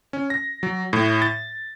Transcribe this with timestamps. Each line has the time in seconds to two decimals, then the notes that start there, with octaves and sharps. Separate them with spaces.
0.13 C#4
0.30 A#6
0.63 F#3
0.93 A2
1.22 A6